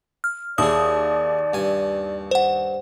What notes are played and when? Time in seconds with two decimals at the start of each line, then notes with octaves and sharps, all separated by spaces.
0.24 F6
0.58 D#2 E4 G#4 D5 D#6
1.54 G2 G#5
2.31 C5 F#5